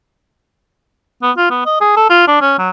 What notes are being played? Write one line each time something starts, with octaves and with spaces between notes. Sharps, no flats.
B3
F4
B3
D#5
G#4
A4
F4
D4
C#4
F#3